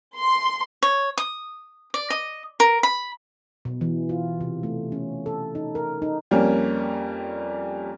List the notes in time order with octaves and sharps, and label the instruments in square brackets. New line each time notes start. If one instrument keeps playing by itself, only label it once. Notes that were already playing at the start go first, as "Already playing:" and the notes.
[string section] C6
[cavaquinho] C#5
D#6
D5
D#5
A#4
B5
[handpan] B2
E3
F4
C3
A3
C#4
A4
D#4
A#4
D#4
[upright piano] F2 G3 A#3 C#4